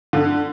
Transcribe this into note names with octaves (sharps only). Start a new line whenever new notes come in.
D3